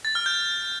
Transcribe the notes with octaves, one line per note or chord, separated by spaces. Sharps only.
A6
F6
G6